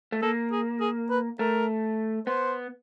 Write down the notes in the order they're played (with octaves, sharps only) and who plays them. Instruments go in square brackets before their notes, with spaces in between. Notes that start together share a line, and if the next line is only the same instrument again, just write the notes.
[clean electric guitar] A3
[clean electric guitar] A#3 [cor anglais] A4
[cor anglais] G#4
G#4
B4
[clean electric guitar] A3 [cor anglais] A#4
[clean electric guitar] B3 [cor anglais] C5